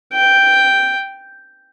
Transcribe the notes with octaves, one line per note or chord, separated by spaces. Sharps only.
G5